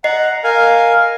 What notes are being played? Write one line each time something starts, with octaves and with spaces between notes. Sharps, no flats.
D#5 F#5 A#5 C7
A#4 F5 G#5